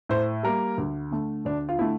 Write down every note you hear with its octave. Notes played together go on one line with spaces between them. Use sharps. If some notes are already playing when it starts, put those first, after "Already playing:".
A2 C5
G3 A#3 A#4
D2
D3 A3
D2 D4
F4
D3 A3 E4